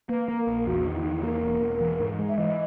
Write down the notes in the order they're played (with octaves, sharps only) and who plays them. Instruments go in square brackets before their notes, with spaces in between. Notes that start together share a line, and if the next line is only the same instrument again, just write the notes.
[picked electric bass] A#3 [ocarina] B4
[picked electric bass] A#3
[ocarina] A#4
[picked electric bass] A#1
[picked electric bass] E2 [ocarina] F#4
[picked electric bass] D#3
[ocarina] E4
[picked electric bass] E2 [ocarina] D#4
[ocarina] E4
[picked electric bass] A#3 [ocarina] A#4
[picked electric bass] E1
E1
E3
G#2
G#3
[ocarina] E5
[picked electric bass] E3 [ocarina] D#5